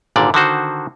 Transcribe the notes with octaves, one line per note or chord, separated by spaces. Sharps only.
G#1 A#2 D3 D5
D3 D#3 F#4 C5